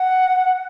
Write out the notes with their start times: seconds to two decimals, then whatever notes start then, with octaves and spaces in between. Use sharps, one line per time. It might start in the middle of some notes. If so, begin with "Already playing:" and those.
Already playing: F#5